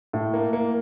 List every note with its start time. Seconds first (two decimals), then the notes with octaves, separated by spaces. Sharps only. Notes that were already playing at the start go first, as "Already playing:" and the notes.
0.13 A2
0.34 A#3
0.53 A#3